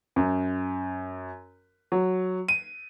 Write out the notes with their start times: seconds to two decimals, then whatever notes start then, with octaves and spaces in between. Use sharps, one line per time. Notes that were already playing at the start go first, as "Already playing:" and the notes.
0.16 F#2
1.92 F#3
2.48 D#7